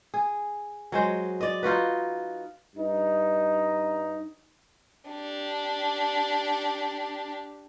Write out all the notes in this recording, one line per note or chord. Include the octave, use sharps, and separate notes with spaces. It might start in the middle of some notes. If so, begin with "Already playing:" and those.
G#4
F#3 G#3 C5
D5 D#5
D#4 F4 F#4 B4
G2 D#4
D4 G4